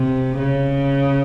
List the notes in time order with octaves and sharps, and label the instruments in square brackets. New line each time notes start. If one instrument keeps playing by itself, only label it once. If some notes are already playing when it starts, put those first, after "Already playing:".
Already playing: [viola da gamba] C3
C#3